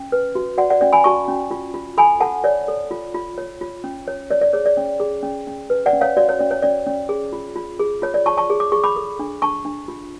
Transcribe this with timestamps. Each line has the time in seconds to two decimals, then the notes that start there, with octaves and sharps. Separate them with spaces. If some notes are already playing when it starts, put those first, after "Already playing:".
Already playing: C#4
0.12 B4
0.35 F#4
0.58 F#4 D5 F#5
0.70 D5 F#5
0.81 C#4 D5
0.93 G#5 B5
1.04 F#4 A5 C#6
1.28 C#4
1.51 F4
1.74 F4
1.98 A4 G#5 B5
2.20 A4 F#5 A5
2.44 C#5 D5
2.68 A4
2.91 F4
3.14 F4
3.38 C#5
3.61 F4
3.84 C#4
4.07 C#5
4.30 C#5 D5
4.41 D5
4.53 G#4 C#5
4.66 D5
4.77 C#4
5.00 G#4
5.23 C#4
5.47 C#4
5.70 B4
5.86 D5 F#5
5.93 C#4
6.01 C#5 F5
6.17 F#4 D5
6.29 C#5
6.39 C#4 D5
6.51 C#5
6.62 C#4 D5
6.87 C#4
7.09 G#4
7.33 F4
7.56 F4
7.80 G#4
8.02 F4 C#5
8.14 D5
8.26 F4 A5 C#6
8.37 A5 C#6
8.50 G#4
8.60 D6
8.72 G#4 C#6
8.84 B5 D6
8.96 A4
9.19 D4
9.42 D4 A5 C#6
9.65 D4
9.88 F4